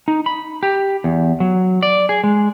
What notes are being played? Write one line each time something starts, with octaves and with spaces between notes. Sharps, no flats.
D#4
B5
G4
E2
F#3
D5
G#4
G#3